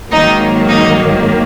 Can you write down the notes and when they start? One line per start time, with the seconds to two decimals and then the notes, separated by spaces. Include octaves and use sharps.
0.11 G#2 D#3 F#3 A#3 D#4
0.69 D#4